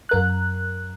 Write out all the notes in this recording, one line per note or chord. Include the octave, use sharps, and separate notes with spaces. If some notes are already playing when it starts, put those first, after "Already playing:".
F#2 A#4 F#6